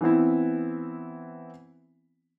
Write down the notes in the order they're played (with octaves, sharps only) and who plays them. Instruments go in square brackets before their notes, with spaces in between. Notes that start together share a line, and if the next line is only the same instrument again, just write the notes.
[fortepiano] E3 B3 C4 E4